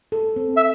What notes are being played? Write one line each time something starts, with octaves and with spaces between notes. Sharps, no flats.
A4
C4
E5